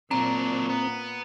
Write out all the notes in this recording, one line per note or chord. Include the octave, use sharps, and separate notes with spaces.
A#2 F#3 C4 D4 A#5
B3